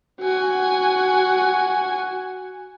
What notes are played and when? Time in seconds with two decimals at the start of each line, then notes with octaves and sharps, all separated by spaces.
0.21 F#4 G#5